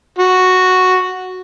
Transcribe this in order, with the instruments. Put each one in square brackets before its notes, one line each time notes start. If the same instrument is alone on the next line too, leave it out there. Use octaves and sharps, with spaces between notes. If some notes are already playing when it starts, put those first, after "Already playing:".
[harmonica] F#4